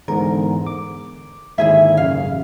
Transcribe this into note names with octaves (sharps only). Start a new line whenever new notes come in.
E2 G#2 D3 A#4
D6
D#2 G#2 D3 E4 G#4 E5
F#2 C#3 F5
A1